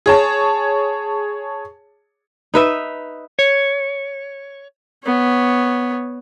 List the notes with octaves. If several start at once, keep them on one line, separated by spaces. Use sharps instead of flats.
G#4 C#5 A5
D#4 B4 E5
C#5
B3 C#5